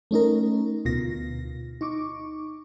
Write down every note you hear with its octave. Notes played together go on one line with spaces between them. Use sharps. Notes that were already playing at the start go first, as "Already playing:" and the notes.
A3 C#4 D#4 A#4
D2 B2 F4 A#6
D#4 C#6 D6